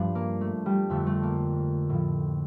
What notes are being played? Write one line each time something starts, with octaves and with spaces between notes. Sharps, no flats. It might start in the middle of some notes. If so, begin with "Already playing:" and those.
Already playing: G2 F3 D4
A#3
A3
G3
F2 D3 F3 A3
A3
A#3
A2 F3